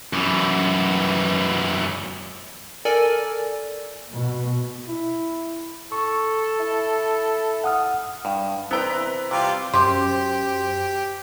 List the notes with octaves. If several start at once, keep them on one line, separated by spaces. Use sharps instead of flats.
F#2 E3
A4 A#4 D5 G#5
B2
E4
A4 C#6
E4
F#5 D#6 F6
G2
B3 C4 E4 B4 C5 G5 A#5 E6
C3 G3 F4 D6
F#2 G4 C5 C6 D6